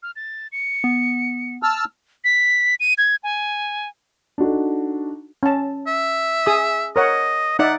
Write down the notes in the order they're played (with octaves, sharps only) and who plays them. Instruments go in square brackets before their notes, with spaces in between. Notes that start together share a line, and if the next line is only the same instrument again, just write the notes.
[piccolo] F6
A6
C#7
[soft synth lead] B3
[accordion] A5 E6 F6
[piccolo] B6
D#7
G#6
G#5
[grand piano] D4 D#4 F#4 A4
[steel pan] C#4 A5
[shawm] E5
[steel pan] G#4 D#6
[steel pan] A#4 C#5 F#5 [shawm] D#5
[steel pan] D#4 D5 E5 [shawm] F#5